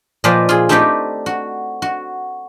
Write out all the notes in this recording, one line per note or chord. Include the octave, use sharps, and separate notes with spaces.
A#2 F3 B4 C5 D5 D#5
F4 G#4
A3 C4 D#4 G4 B4 D5
F#4
F#4